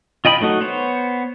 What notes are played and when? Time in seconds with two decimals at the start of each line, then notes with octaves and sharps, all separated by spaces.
0.25 F4 D#5 G5 B5
0.41 F#3 A3 D#4 F#4
0.61 B3 C5 C#5